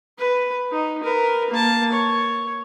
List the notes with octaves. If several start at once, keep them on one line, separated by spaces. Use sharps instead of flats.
B4
D#4
A#4 B4
A#3 A5
C#5